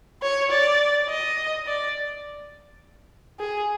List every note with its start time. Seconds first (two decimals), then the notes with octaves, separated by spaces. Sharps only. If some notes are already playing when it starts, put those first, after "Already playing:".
0.22 C#5
0.51 D5
1.09 D#5
1.67 D5
3.40 G#4